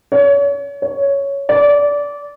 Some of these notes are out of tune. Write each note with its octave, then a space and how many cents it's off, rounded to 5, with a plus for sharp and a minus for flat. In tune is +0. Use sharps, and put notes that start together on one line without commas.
C#5 +35
C#5 +5
D5 -20